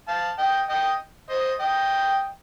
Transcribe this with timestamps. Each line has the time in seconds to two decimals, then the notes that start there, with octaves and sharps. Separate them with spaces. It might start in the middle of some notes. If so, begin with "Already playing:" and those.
0.08 F5 A5
0.39 D#5 G5
0.69 D#5 G5
1.30 C5 D#5
1.60 D#5 G5